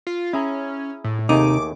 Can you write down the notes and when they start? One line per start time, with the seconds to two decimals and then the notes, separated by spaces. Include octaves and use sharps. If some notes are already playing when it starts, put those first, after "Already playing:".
0.07 F4
0.33 C#4 E4 G#4 A#5
1.04 A2
1.29 D#2 C3 A3 D#4 G#4 D6